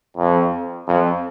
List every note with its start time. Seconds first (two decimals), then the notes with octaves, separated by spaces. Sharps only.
0.17 F2
0.88 F2